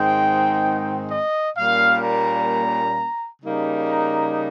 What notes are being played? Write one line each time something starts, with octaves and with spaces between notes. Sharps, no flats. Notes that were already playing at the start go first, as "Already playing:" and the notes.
Already playing: G#2 D#3 G#3 C4 D#4 G5
D#5
A#2 G3 A#3 C#4 F5
A#5
C#3 G3 A#3 D#4
A#5